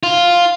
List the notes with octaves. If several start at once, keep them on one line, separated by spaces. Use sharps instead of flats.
F4